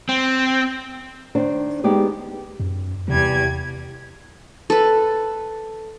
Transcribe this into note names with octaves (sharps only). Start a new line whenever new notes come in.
C4
D#3 D4 C5
G#3 B3 D#4 G4 D5
F#2
E2 C3 G3 G#6
A4 B4